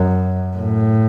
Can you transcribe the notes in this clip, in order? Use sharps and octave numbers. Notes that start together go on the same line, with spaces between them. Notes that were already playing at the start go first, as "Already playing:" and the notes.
Already playing: F#2
A2